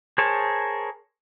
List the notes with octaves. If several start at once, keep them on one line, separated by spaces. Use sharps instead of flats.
G#4 A#4 C5 C#5 A5